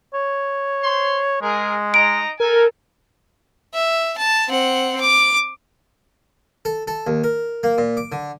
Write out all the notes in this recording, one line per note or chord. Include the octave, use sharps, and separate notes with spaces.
C#5
C5 C6
G#3 G#4 A#4
D#4 D#5 A#5 D7
A4 A#4 G#5
E5
A5
C4 F#5
D6
A4
A4
D#2
A#4
A#3
A#2
D6
D3